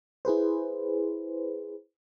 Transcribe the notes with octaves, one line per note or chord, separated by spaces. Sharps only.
E4 G#4 B4 C5